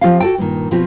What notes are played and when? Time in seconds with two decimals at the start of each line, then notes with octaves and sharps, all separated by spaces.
0.01 F3 C4 F4 G4 F5
0.20 F#4 A4 G5
0.38 G2 A#2 D#3
0.71 B2 F3 C4 F4 G4